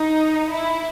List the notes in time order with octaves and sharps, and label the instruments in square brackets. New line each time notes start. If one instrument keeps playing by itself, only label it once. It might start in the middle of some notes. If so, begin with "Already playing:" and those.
Already playing: [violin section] D#4
E4